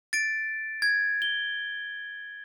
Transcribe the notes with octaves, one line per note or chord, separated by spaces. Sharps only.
A6 D7
G#6
G7